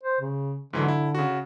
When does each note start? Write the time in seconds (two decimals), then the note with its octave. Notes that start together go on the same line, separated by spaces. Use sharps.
0.03 C5
0.21 C#3
0.73 G#2 D3 E3 F#3
0.88 E4
1.15 C#3 F#4